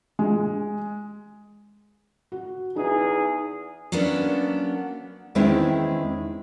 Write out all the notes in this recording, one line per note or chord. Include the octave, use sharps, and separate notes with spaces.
G#3
F#4
E2 D#4 G#4
F#3 A#3 B3 C#4 D4
E2 D#3 G#3 C4 C#4 E4